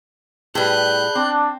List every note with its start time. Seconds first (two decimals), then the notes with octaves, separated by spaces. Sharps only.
0.55 A2 G3 G#4 B4 F#6 G6
1.15 C4 D4